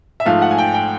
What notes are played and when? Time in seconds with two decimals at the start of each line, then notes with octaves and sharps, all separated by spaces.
0.20 E5
0.25 G#2 F3 A3 F5
0.42 F#5
0.51 G#5
0.58 G5
0.74 G5